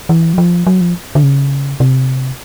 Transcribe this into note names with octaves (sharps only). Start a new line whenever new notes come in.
E3
F#3
F3
F#3
F3
D3
C#3
C3